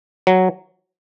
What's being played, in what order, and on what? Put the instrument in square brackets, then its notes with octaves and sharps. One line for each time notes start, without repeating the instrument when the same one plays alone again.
[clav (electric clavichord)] F#3